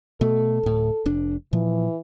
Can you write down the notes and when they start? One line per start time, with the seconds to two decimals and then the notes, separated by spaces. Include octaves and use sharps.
0.21 B2 A3 A4
0.63 D1 A2
1.06 F1 D4
1.53 A#2 E3 F3